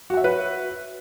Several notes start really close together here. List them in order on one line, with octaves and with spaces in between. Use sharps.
F#4 F#5 E5 C#5 B4